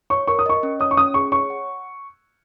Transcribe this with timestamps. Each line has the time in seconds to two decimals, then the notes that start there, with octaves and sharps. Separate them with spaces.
0.10 C#5 C#6
0.27 A#4 C#6
0.39 D#6
0.46 D#5 C#6
0.63 C#4
0.80 C#5 D#6
0.91 C#6
0.97 C#4 D#6
1.14 G#4 C#6
1.32 C#5 C#6
1.50 F#5